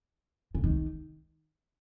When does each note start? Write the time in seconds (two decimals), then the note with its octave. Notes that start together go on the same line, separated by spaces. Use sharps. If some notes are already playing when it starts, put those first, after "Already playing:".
0.55 C#3
0.64 D#3